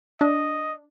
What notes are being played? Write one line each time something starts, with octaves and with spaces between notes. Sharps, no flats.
D4 D#5